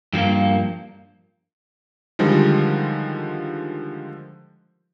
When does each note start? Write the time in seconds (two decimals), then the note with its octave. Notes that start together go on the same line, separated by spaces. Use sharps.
0.13 G2 F3 A3 A#3
2.19 D3 D#3 F3 G3 G#3